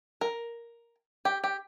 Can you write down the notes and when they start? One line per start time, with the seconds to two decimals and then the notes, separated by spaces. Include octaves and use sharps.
0.21 A#4
1.25 G4
1.44 G4